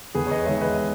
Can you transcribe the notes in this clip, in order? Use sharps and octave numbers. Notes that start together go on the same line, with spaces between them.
E2 G#4 B4
C#5
B4 D#5
D#3 G#3 C#5 E5
B4 D#5